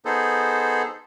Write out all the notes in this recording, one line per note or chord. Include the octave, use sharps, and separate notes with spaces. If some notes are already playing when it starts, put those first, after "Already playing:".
B3 D#4 G#4 A4 C5